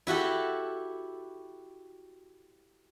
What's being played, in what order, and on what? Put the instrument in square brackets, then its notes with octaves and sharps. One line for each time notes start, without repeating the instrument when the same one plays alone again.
[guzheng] E4 F#4 G4 A4